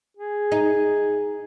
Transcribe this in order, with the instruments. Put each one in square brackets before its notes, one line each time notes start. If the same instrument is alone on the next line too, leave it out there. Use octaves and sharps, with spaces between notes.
[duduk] G#4
[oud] D#4